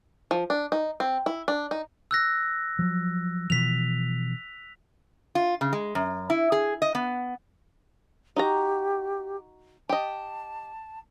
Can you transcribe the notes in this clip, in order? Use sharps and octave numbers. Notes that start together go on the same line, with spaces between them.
F3
D4
D#4
C4
E4
D4
D#4
E6 F#6 A#6
F3 F#3
B2 E3 F3 B6 F7
F4
C#3
G#3
F#2
E4
G#4
D#5
B3
D#4 F#4 G4 A#5
G4 D#5 A5